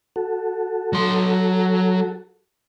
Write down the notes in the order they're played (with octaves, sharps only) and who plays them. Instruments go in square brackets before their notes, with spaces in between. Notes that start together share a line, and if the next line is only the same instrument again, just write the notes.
[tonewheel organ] F#4 A4
[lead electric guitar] F#3 C6